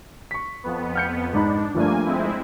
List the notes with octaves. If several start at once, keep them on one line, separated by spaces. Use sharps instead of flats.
C#6 B6
F2 B3
F6 G6 C#7
G#2 D4 D#4 B5
G2 F3 A3 A#3 D4 G#5
G#3 C4 E4